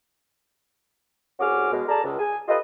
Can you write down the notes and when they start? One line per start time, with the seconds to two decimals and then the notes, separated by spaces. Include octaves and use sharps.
1.40 C2 C#4 F#4 G#4 D6 F6
1.72 B2 G#3
1.88 G#4 A4 D5 A5 A#5
2.04 C#2
2.18 G#4 G#5
2.48 F4 G4 A4 B4 D#5